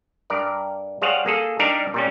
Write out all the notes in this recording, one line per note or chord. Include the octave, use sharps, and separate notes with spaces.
G2 A#4 D5
G3 G#4 C5 C#5 F5 F#5
A#3 G#4 A4
G3 D4 D#4 G4 A#4 D5
A#2 G3 C#4